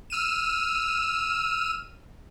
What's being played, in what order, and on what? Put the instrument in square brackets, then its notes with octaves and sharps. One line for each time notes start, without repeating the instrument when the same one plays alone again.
[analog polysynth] E6 F6 D#7 E7